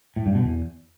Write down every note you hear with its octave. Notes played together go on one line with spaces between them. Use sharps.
A2
G2
B2
E2